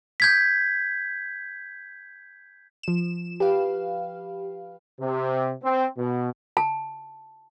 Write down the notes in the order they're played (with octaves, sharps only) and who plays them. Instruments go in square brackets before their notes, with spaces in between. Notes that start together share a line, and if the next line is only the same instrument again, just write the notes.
[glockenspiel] G6 G#6 B6
[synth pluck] F3 E7
G4 B4 F5
[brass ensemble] C3
C4
B2
[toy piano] A5